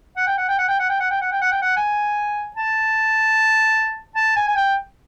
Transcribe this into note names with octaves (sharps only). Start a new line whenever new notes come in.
F#5
G5
F#5
G5
F#5
G5
F#5
G5
F#5
G5
F#5
G5
F#5
G5
F#5
G#5
A5
A5
G#5
G#5
G5